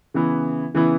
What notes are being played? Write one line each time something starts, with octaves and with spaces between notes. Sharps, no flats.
C#3 E3 B3 E4
C#3 E3 B3 E4